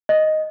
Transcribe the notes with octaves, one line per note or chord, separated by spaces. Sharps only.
D#5